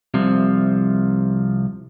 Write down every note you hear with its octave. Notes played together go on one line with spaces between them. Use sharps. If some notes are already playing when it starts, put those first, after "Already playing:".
C2 C3 F3